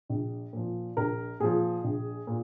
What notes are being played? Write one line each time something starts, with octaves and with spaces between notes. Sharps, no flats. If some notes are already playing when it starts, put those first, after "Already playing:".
A#1
A#2 F3
A#1 A#4
A#2 F3 G#4
A#1
A#2